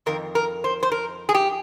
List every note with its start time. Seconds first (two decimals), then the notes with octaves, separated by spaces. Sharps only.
0.06 F2 D#3 A#4
0.35 A#4
0.64 C5
0.83 C5
0.92 A#4
1.29 G#4
1.35 G4